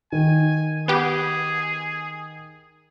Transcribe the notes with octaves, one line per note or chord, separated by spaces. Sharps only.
D#3 G#5
B3 G4 G#4